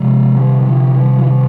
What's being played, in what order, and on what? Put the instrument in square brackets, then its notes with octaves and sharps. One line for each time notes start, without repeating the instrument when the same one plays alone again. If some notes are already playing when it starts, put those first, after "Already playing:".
Already playing: [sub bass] C3 [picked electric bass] F3 G#3
[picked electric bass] D#3 G3
D#3
D3 F3
D#3 G3
F3
D#3 G3